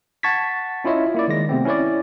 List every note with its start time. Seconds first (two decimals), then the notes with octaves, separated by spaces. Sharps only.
0.23 F#5 A5 C#6 G#6 A6 B6
0.84 C#4 E4 F4 C#5 D#5 E5
1.15 A#3 E4 D5
1.28 D#3 G#3 A#6
1.49 C3 A3 B3 C4
1.65 C#4 E4 B4 C#5 D5